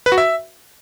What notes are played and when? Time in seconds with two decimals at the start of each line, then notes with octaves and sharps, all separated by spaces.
0.06 B4
0.12 F#4
0.18 E5